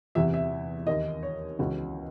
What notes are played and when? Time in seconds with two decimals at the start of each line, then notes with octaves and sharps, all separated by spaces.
0.15 E2 C3 E3 E5
0.34 E5
0.87 D#2 D#3 D#5
1.23 C#5
1.59 C#2 C#3 E3 F#4